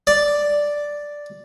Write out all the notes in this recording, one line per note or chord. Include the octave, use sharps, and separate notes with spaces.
D5